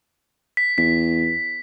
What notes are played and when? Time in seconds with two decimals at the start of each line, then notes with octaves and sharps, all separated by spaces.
0.57 B6
0.78 E2 B6